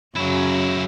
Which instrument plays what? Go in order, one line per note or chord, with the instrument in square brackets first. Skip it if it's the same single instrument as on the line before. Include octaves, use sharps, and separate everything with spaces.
[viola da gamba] F#2 C#3 [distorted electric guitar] F#3 E4